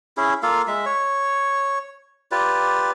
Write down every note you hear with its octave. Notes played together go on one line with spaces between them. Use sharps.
C#4 E4 G#4
A#3 F4 A4 F5
G#3 E5
C#5
F4 G4 B4 D5